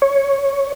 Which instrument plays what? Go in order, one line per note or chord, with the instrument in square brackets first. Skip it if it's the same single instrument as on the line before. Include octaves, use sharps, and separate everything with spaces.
[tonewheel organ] C#5